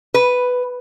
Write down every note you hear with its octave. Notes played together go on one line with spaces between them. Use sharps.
B4